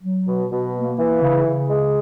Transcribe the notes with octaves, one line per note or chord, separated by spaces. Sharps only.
F#3
B2
B2
A#3
E3
C#3
C#3
G#3